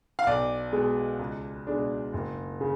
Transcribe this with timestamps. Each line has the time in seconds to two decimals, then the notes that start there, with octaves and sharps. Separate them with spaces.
0.19 F5
0.27 B1 D5
0.72 B2 G#3
1.19 C#2
1.67 B2 G#3 D4
2.13 F#1
2.61 C#3